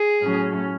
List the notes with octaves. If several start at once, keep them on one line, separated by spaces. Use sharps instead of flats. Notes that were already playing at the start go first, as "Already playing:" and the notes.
Already playing: G#4
A2 F#3 A3 C#4